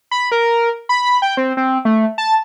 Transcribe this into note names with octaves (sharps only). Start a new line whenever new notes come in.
B5
A#4
B5
G5
C4
C4
A3
A5